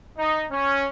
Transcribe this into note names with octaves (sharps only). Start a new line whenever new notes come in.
D#4
C#4